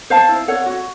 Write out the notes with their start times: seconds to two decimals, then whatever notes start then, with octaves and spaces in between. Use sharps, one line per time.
0.10 C5 F5 A5
0.29 E4
0.48 A4 C#5 F#5
0.66 F#4